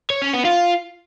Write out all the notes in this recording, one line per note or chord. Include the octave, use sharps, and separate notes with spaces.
C#5
C#4
B3
F4